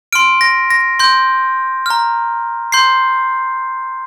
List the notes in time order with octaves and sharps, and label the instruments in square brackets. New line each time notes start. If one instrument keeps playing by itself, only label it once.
[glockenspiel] C6 F6 D7
A#6
A#6
C6 G6
A#5 F6
C6 G6 C7